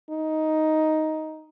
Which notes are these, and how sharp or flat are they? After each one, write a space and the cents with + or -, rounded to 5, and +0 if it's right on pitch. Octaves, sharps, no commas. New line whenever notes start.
D#4 +5